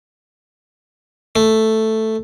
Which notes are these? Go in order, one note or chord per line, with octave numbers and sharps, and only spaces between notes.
A3